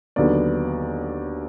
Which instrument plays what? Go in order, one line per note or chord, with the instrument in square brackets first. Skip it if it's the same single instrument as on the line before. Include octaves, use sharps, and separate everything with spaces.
[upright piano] D#2 D3 F#3 B3 D5